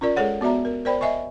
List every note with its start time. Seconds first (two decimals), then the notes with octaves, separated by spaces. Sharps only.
0.01 C#4 F4 A#4 D5
0.16 G#3 G#4 A4 C#5 F#5
0.41 B3 F#4 D5 E5 A#5
0.65 A#4
0.85 A#4 C5 D5 G5 B5
1.01 D#5 E5 G#5 C#6